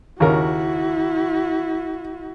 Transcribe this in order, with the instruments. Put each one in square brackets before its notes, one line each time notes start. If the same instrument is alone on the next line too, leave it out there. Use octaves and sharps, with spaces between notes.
[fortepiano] D#2 C#3 A#4 [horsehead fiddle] E4 F#4